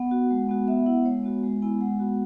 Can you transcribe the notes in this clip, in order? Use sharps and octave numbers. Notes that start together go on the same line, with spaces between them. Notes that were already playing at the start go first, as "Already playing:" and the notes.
Already playing: B3 F#5
F#4
G#3
B3 F#4
B3 E5
E4 F#5
G#3 C#5
B3 F#4
G#3
B3 E4 G#5
G#3 F#5
B3 F#4